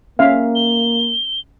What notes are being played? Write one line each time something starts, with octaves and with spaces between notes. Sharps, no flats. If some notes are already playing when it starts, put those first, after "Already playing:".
A#3 C#4 E5 F5
G7